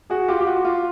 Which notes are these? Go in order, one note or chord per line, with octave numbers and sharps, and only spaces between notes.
F#4 G#4
F4 G4
G4
F#4
F4